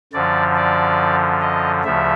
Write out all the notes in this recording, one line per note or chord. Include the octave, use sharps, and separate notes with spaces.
F#2 D3 F3 D5
D5
D#5
D2 C#3 F3 E5